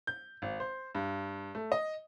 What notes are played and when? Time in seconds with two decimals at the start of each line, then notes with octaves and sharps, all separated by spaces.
0.07 G6
0.42 G#1
0.60 C5
0.95 G2
1.55 A3
1.72 D#5